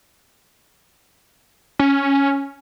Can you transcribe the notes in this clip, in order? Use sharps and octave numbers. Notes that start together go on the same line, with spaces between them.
C#4